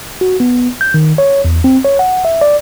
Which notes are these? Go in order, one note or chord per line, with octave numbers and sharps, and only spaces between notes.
F#4
B3
G6
D#3
C#5
E2
C4
C#5
F#5
E5
D5